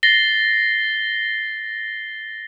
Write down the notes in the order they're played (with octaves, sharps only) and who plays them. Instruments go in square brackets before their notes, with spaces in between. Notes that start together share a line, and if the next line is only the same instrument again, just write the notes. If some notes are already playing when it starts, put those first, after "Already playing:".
[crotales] A6 A#6 C7 G7